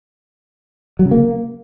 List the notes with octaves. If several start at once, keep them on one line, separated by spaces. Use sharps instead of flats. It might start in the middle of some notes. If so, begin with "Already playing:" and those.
F#3
C#3
A#3